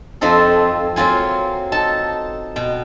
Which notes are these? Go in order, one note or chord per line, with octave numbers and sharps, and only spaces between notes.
F2 F3 C4 D#4 A4
F#3 A#3 C4 F4 G#5
D#4 A4 A5
B2 G5